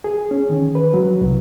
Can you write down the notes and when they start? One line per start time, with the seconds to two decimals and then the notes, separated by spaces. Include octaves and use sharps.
0.04 G#4
0.31 C#4
0.50 D#3
0.75 B4
0.94 F#3
1.21 C2